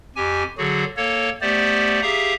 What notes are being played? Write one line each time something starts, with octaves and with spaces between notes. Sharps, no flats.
F2 G4 G#5
D3 F#3 F#4 G#4
A#3 A4 C#5
A3 B3 G4 C5 D5
G4 G#4 E5 F5 A#5 D#6